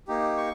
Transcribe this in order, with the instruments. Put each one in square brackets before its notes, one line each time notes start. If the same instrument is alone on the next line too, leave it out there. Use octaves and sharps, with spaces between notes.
[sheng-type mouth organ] A#3 D#4 G4
C#6